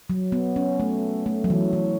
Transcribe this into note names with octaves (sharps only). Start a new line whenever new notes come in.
F#3
B3
C#4
A3
A3
F#3
E3
E3